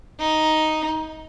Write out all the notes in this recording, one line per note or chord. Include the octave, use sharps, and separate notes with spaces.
D#4